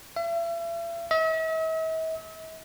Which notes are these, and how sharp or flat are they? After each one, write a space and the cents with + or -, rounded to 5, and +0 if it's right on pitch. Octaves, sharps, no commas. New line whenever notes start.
E5 +40
E5 -45